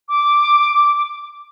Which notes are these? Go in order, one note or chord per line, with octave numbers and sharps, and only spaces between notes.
D6